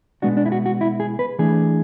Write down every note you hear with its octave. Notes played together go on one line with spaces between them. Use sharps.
B2 G#3 B3 D4 F#4
D4
E4
F#4
F#4
E4
G#4
B4
E3 A3 D4 G#4